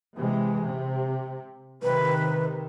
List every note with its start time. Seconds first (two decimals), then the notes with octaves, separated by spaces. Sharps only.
0.17 C3 E3 G#3
0.62 C3
1.83 C3 D#3 B4